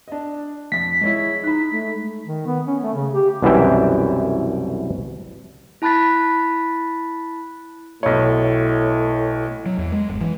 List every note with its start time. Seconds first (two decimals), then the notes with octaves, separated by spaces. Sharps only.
0.08 D4 D#5
0.72 F2 A6 B6
1.02 G#3 E4 C#5 D#5
1.44 D#4 B5 F#6
1.72 A3
2.26 D#3
2.46 B3
2.67 C#4
2.83 A3
2.94 C#3
3.13 G4
3.43 C2 F#2 B2 E3 E5 G5
5.82 E4 A5 B5 F#6 A6 B6
8.03 B1 A2 C#5
9.66 F#3
9.78 E2
9.92 G#3
10.09 G1
10.21 E3